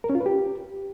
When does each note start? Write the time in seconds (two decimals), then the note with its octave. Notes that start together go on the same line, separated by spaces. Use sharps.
0.04 A#4
0.10 C#4
0.15 F4
0.20 B4
0.26 G4